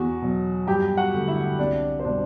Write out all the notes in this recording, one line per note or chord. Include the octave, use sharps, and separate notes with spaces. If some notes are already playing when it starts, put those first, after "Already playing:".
Already playing: E2 F#4
B2 F#3
G2 G4 G5
F#4 F#5
D3 A3
E4 E5
C2 D4 D5
C5
B2 G3 D4 D5